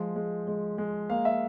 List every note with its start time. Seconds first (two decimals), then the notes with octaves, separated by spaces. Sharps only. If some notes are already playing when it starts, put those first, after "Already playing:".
Already playing: F3 G#3
0.16 G#3
0.48 G#3
0.78 G#3
1.10 A#3 F5
1.25 E5